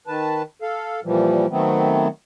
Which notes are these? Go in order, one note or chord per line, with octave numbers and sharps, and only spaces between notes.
D#3 B4 A5
A4 F5
A#2 E3 F3 G3
D#3 F#3 A3 B3 C4